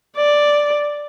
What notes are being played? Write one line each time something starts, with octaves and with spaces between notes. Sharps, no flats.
D5